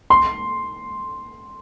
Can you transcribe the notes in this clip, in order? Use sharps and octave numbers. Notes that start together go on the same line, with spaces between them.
C6